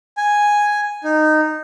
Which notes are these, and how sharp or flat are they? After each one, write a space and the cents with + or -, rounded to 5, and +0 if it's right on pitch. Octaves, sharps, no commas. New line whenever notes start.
G#5 +0
D#4 -15